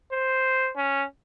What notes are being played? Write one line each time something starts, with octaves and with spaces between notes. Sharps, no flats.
C5
C#4